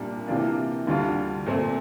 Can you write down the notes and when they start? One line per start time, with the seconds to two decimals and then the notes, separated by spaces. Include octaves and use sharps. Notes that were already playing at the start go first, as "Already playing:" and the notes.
Already playing: C2 A#2 G3 A#3 D4
0.27 C3 E3 A#3 D4 F4
0.87 D2 D3 G3 D4 F4
1.46 A#2 A3 C4